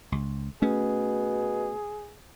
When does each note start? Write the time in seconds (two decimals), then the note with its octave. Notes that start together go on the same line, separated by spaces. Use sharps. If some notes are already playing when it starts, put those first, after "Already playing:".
0.12 C#2
0.62 B2 A3 C#4 G#4